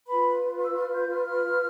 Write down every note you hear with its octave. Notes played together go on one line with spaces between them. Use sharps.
F4 B4 B5
E6
F6
G6
F6
F6